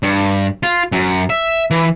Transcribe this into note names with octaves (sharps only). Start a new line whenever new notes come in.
G2
F4
F#2
E5
E3